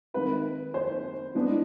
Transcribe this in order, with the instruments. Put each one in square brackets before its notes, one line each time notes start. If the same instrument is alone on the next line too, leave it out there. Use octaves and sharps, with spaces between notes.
[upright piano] D#3 G#3 C4 B4
C5
E3 G#3 B3 D4